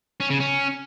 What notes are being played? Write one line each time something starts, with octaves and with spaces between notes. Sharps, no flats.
C#4
C#3
C#4